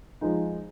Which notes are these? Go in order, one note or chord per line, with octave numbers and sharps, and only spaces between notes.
F3 G#3 D#4